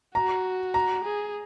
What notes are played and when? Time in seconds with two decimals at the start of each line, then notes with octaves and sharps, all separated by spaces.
0.15 F#4 A#5
0.74 A#5
1.04 G#4